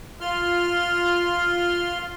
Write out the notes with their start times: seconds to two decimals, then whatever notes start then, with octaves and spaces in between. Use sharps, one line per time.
0.21 F4 C6 F6